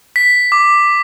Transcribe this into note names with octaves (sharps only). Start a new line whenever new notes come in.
B6
D6